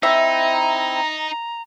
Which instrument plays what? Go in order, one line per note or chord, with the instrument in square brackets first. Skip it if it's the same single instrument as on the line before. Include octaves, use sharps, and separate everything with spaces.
[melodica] C4 E4 [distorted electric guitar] D#4 [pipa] E5 [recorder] A#5